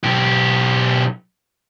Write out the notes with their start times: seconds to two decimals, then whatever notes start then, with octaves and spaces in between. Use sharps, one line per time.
0.04 B1 G4